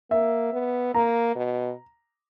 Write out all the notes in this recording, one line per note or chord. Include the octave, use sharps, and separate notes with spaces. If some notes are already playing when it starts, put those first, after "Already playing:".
A#3 E5
B3
A#3 A#5
B2